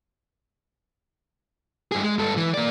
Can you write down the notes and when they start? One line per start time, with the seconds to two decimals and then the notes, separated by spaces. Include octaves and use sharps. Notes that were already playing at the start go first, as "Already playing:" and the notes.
1.92 G2 G#4
2.04 G#3
2.19 G2 A4
2.37 E3
2.54 A#3 D5